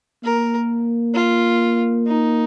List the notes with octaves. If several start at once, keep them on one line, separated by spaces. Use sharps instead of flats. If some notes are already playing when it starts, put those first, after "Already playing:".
A#3 A#4
F4
D#4